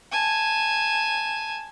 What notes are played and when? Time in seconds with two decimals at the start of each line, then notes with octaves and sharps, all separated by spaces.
0.11 G#5 A5